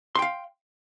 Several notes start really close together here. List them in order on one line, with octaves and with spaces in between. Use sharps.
C6 G5 F5